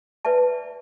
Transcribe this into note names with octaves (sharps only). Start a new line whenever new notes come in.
B4 D5 E5 A5